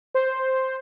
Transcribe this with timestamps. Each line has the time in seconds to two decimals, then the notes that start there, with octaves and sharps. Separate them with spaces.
0.15 C5